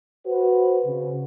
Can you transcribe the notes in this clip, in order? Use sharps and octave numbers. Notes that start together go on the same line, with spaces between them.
F#4 B4 C5
C#3